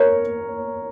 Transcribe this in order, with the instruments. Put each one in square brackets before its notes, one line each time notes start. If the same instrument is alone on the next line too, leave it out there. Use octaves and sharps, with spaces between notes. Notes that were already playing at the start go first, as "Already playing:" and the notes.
Already playing: [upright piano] A#4 C#5